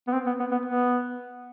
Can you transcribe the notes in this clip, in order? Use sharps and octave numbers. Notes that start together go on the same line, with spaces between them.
B3
C4
B3
B3
B3
B3